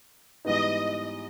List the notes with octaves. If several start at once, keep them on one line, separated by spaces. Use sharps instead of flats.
G#2 E3 G3 B3 D#4 D#5